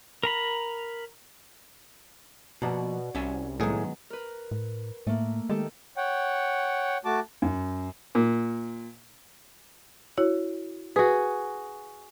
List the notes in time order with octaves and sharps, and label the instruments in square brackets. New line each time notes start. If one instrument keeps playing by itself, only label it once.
[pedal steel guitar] A#4 A#5 B5
[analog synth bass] B2 [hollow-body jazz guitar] F3 A#3 [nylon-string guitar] F#4 D5 F#5
[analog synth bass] C2 [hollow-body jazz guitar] C#4 E5 G#5
[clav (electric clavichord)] A2 G#4 [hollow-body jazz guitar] D#3 F#3 [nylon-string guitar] G#3 B3 D#5
[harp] A#4 B4
[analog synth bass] A2
[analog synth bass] A2 [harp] A3 A#3
[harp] D#3 G4 A4 [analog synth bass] G#3
[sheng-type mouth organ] C#5 F#5 G5
A3 F#4 A5 D6
[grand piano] F#2
[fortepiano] A#2
[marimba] E4 F#4 C#5
[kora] F#4 G#4 [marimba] B4